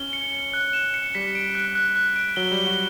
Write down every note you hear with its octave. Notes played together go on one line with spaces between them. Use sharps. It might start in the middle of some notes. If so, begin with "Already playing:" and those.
Already playing: C#4 G7
C#7
C#7
F#6
E7
C#7
G3 B6
D7
F#6
F#6
F#6
D7
F#3 G7
G3
G7
F#4